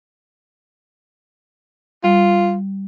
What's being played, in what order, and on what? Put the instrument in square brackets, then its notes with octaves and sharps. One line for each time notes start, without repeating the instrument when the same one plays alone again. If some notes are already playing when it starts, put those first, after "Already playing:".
[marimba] G3 [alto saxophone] F4